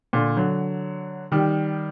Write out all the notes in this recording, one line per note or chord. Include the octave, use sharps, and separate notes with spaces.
A#2 D3
D3 F#3
D#3 G3